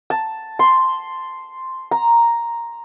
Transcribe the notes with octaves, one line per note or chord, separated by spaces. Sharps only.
A5
C6
A#5